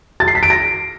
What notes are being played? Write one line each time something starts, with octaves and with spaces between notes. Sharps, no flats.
A6
C7
B6
D7
A#6